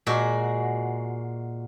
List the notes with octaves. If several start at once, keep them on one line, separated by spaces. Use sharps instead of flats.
A#2 G#3 F#4